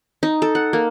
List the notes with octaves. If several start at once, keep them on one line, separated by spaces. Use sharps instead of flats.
D#4
A4
F#5
A#3